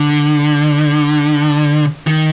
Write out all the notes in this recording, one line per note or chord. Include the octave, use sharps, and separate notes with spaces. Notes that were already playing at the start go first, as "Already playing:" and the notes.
Already playing: D3
D#3